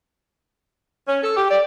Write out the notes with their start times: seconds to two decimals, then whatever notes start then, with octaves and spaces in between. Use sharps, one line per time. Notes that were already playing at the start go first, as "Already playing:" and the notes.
1.07 C#4
1.22 A4
1.36 G4
1.50 D5